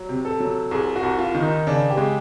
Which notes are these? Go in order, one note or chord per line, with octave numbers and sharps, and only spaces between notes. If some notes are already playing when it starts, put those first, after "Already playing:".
Already playing: F#3
C3
A4
F#3
C2 G#4
F#4
C2
F4
D#3
D#4
C#3 D4
G4
G#3